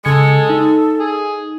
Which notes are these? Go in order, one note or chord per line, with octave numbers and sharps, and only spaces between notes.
C#3 G#3 A4 G#6 C#7
D#4
G#4